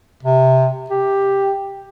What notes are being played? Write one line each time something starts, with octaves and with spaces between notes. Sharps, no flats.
C3
G4